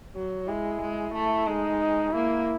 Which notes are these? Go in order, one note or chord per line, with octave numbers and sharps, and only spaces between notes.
F#3
G#3 E4
G#3
A3
G#3 D#4
A#3 E4